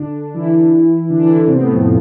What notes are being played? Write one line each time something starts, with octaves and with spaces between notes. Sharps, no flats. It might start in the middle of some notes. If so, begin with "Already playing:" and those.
Already playing: D3 D4
E3 E4
D3 D4
E3 E4
D3 D4
C3 C4
B3
A2 A3
F2 F3